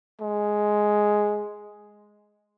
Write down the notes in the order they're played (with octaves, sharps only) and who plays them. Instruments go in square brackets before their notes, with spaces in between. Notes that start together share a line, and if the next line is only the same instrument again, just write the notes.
[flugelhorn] G#3